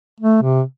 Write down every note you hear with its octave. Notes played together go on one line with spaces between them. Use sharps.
A3
C3